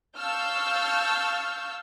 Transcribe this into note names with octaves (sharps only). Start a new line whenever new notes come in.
F5 A5 C#6 E6 F6 G6